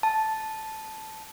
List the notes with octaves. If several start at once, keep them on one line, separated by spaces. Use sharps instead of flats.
A5